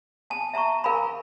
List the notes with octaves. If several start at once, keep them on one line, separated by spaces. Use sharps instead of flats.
G#5 A5
E5 A5 A#5 C#6
A#4 F5 G#5 A#5 B5